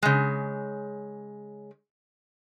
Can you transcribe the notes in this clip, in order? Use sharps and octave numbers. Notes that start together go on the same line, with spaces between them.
C#3 G#3